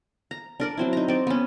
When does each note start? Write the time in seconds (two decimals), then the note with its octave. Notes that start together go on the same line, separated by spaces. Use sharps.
0.31 A#5
0.60 D4 A#4 D5
0.77 F#3 C4 E4
0.93 D#4 A#5
1.08 C4 D5
1.27 B3 C#4